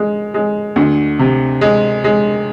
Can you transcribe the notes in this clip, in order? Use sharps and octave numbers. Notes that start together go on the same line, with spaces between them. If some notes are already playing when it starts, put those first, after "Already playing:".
Already playing: G#3
G#3
D2
C3
G#3
G#3